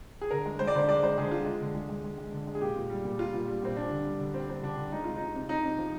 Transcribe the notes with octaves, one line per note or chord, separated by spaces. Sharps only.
G#4
D3 A#4
G#3
G#3 C5
D5
D3 C5
G#3 D5
G#3 C5
D3 G#4
G#3 F4
G#3
D3
G#3
G#3
G#3
G#3
D3
G#3
G#4
A#2 G4
A#2
G3
A#2
G3 F4
A#2
G3
A#2 C4
G3 D4
D3
G3
D3
G3 C4
G3 C4
D3 D4
D3
G#3 D#4
C3 F4
D#4
C3
C3
C3 D#4
C3
F3